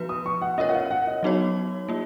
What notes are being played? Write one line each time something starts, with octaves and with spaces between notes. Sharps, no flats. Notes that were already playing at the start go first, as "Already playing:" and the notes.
Already playing: F3 B3 F#4 B4
D#6
C#6
F#5
C#4 F4 A#4 C#5 D#5
F#5
F5
F#5
D#5
F#3 B3 D#4 F#4 C#5
A#3 F4